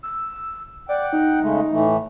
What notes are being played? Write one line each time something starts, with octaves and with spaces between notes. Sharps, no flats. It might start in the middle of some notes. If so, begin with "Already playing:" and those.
E6
D5 F#5 G5
D#4
C#3 G#3 A3
A2 E3 A3